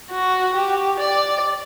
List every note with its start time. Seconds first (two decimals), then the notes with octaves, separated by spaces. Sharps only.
0.11 F#4
0.55 G4
0.99 D5